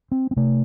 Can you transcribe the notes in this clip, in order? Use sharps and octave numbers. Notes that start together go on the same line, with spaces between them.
C4
C4
C3 A3